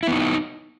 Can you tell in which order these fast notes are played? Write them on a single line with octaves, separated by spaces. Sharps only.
E4 B3 D#4